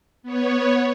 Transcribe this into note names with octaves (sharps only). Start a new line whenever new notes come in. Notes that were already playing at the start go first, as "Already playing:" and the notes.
B3 C#5